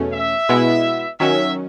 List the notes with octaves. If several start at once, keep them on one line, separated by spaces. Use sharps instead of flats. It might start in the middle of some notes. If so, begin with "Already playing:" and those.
Already playing: E2 B2 A3 C#4
E5
B2 G#3 B3 E4
D#3 F#3 C#4 E5